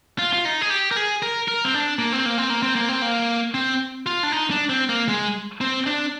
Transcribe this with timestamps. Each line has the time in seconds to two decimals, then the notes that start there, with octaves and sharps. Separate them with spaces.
0.18 F4
0.34 F4
0.45 D#4
0.61 G#4
0.70 G4
0.91 A#4
0.96 G#4
1.22 A#4
1.48 A#4
1.64 C4
1.74 D4
1.99 A#3
2.12 C4
2.26 A#3
2.38 C4
2.50 A#3
2.63 C4
2.75 A#3
2.89 C4
3.02 A#3
3.54 C4
4.06 F4
4.23 D4
4.32 D#4
4.50 D4
4.70 C4
4.89 A#3
5.08 G#3
5.61 C4
5.86 D4